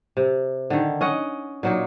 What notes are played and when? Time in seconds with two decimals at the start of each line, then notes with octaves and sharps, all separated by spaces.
0.17 C3
0.70 D3 D#3
1.01 C#4 D#5 F#5
1.63 A#2 F#3 D#4